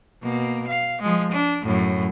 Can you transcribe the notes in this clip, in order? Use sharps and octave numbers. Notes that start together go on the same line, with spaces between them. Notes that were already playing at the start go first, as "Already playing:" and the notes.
B2 A#3
F5
F3 G#3
D4
F#2 A2